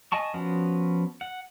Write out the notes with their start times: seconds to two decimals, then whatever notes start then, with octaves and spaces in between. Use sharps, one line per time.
0.12 D#5 G#5 A5 C#6
0.34 F3 B3 C#4 F#4
1.21 F#5